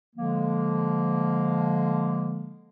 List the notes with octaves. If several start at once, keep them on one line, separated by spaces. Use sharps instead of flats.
D3 F3 G#3 A#3